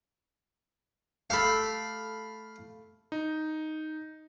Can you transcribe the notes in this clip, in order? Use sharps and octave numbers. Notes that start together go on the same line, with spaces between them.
A3 G4 A4 F5 B5
D#4